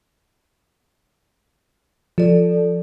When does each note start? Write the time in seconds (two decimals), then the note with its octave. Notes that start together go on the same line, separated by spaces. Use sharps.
2.18 F3 A4 D5